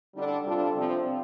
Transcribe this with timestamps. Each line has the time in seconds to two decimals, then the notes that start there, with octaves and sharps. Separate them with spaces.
0.14 D3 G3 D4 A4
0.45 C3 G3 D4 F4 A4
0.75 C3 F3 C4